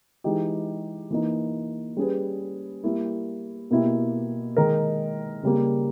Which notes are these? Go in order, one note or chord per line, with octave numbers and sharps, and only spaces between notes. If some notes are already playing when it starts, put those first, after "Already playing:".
E3 G#3 D#4 G4
E3 A#3 D#4
G3 C#4 G#4 B4
G3 A#3 E4
B2 A#3 E4 G4
D#3 G#3 D#4 A#4
C#3 G3 A#3